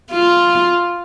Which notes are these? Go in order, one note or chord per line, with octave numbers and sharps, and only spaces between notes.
F4